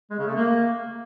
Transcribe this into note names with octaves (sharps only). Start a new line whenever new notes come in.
G#3
C#3
A3
A#3